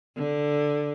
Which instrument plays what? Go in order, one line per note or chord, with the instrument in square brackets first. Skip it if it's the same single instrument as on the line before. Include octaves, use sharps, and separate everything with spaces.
[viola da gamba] D3